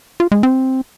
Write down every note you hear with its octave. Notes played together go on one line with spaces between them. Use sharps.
F4
G#3
C4